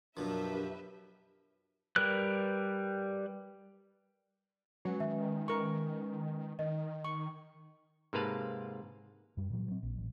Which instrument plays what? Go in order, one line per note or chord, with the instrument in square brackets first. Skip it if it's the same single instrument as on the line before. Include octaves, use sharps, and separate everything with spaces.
[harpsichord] F#2 B2 F3 [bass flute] D4 [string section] G4 B4 E5 [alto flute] A#4
[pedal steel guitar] G3 A#4 B4 F#6
[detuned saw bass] F#3 [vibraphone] G#3 C#4 B4 [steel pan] F#4
[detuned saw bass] D#3 [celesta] E5
[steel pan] A#4 C#6
[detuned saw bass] D#3 [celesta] D#5
[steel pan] C#6
[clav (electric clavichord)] G#2 C3 A#3 B4 F5 A5
[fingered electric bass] F#2 G3
A#2 E3 F#3
F#3 C4
A#1
A1